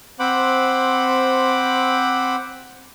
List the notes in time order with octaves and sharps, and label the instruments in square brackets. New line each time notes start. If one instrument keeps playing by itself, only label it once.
[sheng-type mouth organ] C4 C5 F#5 B5 D6